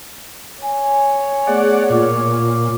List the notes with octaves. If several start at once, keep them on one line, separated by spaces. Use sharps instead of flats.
C#5 G#5
A3 B3 G#4 D5 F#5
A#2 F4 D6